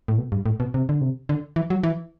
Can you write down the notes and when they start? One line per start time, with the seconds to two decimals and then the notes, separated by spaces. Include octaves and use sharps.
0.08 A2
0.18 B2
0.32 G2
0.46 A2
0.60 B2
0.74 C3
0.89 D3
1.01 C3
1.29 D3
1.56 E3
1.70 F#3
1.83 E3